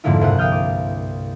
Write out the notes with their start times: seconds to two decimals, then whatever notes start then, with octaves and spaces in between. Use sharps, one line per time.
0.04 F2 G#2 D3 A#3 E4 F4
0.21 C2 G2 C3 F#5
0.38 F5 G5 D#6 F6 G6
0.52 D6